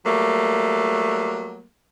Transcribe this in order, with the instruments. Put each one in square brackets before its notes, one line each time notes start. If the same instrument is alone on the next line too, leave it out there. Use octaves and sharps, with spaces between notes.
[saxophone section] F#3 G3 A3 A#3